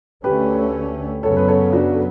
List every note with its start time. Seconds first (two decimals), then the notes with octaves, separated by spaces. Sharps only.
0.24 D2 D3 A3 C#4 G4 B4
1.23 F#2 C#3 F#3 B3 A4 C#5
1.37 B4
1.48 A4 C#5
1.73 D4 F#4
1.93 A4